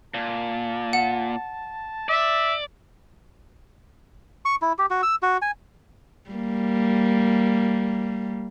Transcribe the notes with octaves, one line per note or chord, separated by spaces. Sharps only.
A#2 A5
F#5
D5 E5
C#6
E4
G4
F#4
E6
F#4
G#5
G3 A#3